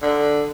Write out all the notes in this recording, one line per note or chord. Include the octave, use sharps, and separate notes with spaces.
D3